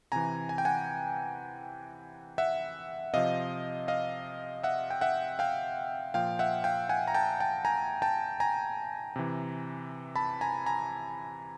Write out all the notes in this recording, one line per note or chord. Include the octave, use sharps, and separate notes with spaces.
C3 E3 G#5 A#5
G#5
G5
F#5 G#5
E5 F#5
C3 F3 D#5 F5
D#5 F5
E5 F#5
G5
E5 F#5
F5 G5
A#2 F3 F5 G5
E5 F#5
F5 G5
F#5 G#5
A#5
G5 A5
G5 A5
G#5 A#5
G5 A5
G#5 A#5
C3 E3
A5 B5
G#5 A#5
G#5 A#5